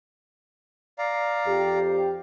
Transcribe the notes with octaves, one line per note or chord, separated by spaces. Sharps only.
D5 F5 A#5
F2 G4